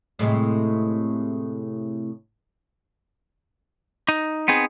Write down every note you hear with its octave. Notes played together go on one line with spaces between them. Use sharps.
A2 C3 G#3
D#4
B3 C4 D#4 G#4